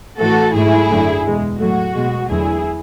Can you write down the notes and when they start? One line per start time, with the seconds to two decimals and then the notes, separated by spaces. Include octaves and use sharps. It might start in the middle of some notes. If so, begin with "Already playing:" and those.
0.19 A2 E3 A3 F#4 A4
0.54 G#2 F#3 A3 E4 G#4
0.89 F#2 D3 F#3 A3
1.25 E2 B2 G#3
1.60 A2 F#3 A3 F#4
1.95 B2 G#3
2.29 E2 D3 F#3 A3 E4 G#4